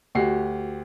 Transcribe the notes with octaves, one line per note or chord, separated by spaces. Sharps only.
D2 F#4 G4 C7